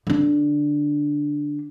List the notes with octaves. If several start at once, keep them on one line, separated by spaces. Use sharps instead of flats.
D3 D4